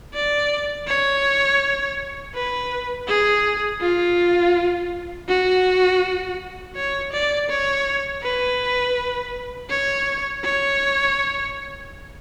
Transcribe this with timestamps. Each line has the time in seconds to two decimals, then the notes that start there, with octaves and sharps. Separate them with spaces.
0.14 D5
0.88 C#5
2.35 B4
3.08 G#4
3.81 F4
5.29 F#4
6.76 C#5
7.13 D5
7.49 C#5
8.23 B4
9.70 C#5
10.44 C#5